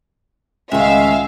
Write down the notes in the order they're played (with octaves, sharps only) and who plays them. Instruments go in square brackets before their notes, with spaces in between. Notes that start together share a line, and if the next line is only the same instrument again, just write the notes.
[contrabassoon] C#2 [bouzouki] A2 D#3 [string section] E5 F5 [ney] G#5